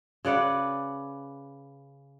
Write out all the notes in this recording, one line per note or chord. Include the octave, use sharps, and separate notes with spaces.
C#3 B4 D5 F#5